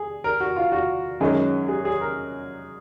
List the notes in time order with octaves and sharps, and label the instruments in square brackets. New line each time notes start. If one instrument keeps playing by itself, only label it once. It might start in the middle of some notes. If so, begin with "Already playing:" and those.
Already playing: [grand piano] G#4
A#4
F#4
F4
F#4
[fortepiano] F#2 D#3 G#3 C#4
[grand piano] G#4
G#4
A#4